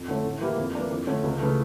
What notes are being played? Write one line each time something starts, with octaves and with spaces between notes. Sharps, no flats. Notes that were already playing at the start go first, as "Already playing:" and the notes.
Already playing: F2
D3 A3 C#4
A2
E3 A#3 E4 G4
F2
E3 A#3 D4
F2
D3 A3 C#4
C#2
C#3 E3 A3